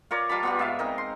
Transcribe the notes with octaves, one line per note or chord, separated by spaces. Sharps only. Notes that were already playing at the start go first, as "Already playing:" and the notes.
F4 A#4 C#5 D5
G3 F4 A5 B5
B3 F4 G4
G#2 E5 F5
C4 D#4 A#4
C6